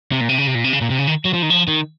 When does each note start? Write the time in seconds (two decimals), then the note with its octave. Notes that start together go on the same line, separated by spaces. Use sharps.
0.12 C3
0.21 A#2
0.29 C3
0.38 C#3
0.47 C3
0.55 A#2
0.64 C3
0.73 C#3
0.81 A#2
0.90 C3
0.99 C#3
1.07 D#3
1.25 F#3
1.34 F3
1.42 D#3
1.50 F3
1.68 D#3